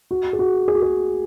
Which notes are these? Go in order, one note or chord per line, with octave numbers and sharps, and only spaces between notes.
F#4
G#4
F#4
G#4
F#4
G#4